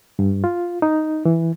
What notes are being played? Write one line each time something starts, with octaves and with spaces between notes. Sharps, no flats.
G2
F4
D#4
E3